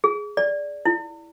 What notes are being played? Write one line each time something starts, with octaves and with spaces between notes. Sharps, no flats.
G#4
D5
E4